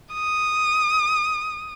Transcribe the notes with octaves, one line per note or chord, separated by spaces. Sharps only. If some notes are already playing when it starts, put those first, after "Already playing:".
D#6